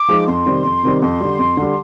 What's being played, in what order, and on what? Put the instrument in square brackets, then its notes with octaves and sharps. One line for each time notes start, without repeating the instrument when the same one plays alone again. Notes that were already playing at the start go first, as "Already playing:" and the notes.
Already playing: [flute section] D6
[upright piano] F3 G#3 D#4 G#4
[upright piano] F2 [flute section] C6
[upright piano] C3 D#3 G3 C4
F2
C3 D#3 G3 C4
[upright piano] F2 [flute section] C6
[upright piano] D3 G3
F2
D3 G3